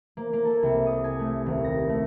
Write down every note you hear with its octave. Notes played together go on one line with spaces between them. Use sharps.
A#3
A#3
A4
C2
D#6
G#5
A3
D#1
A#6
A3